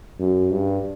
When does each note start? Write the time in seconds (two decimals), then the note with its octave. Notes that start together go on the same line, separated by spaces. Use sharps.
0.19 F#2
0.50 G2